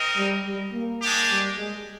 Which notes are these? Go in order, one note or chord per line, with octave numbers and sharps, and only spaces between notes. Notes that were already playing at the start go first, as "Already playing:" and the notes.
Already playing: C4 D#4 A#4 D#5
G3
G3
A#3
G#3 D4 G4
G3
G#3